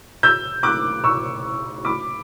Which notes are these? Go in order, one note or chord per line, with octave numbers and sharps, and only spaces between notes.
E6 G6
D6 F#6
C#6 E6
B5 D6